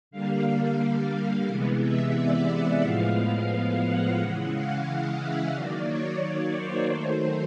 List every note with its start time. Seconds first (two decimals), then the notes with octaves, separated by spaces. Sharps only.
0.11 D3 G3 A#3 F5
0.79 F5
1.46 C3 E3 G#3 B3
1.81 E5
2.15 D5
2.47 F#5
2.81 A2 F3 G#3 B3 F5
3.49 F5
3.83 F#5
4.17 C#3 E3 G#3
4.52 F5
4.85 F#5
5.19 E5
5.53 D#3 F#3 A#3 D5
5.86 C#5
6.20 C#5
6.54 C5
6.88 D#3 F#3 A3 C5